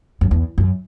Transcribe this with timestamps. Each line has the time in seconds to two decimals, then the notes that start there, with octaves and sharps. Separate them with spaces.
0.21 F#2
0.31 E2
0.58 F#2